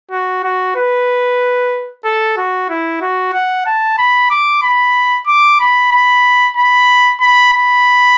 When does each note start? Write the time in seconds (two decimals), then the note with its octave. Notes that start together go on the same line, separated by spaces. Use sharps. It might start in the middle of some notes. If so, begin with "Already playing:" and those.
0.11 F#4
0.44 F#4
0.76 B4
2.05 A4
2.37 F#4
2.69 E4
3.01 F#4
3.33 F#5
3.66 A5
3.98 B5
4.31 D6
4.62 B5
5.27 D6
5.60 B5
5.92 B5
6.57 B5
7.21 B5
7.54 B5